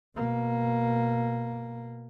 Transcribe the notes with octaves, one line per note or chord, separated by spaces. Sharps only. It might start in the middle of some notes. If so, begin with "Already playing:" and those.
B2 A#3